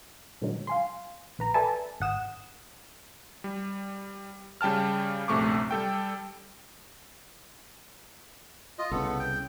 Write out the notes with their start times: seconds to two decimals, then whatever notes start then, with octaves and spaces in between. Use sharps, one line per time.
0.41 A#2 D3 D#3 F#3 G#3
0.67 F5 G#5 C6
1.39 A#1 B4 A#5
1.54 A4 B4 D5 E5 G#5 A5
2.00 G#1 G#2 F#5 D#6 E7
3.44 G3
4.61 C#3 G3 G5 A5 F6
5.28 A#1 F#2 C3 A3 C#6 D6
5.71 G3 A4 G5
8.79 F4 D#5
8.91 C2 C#3 B3 A4
9.19 G5